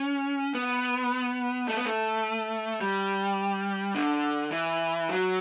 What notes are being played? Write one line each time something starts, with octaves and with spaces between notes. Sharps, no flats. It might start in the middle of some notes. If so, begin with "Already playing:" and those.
Already playing: C#4
B3
A3
B3
A3
G3
D3
E3
F#3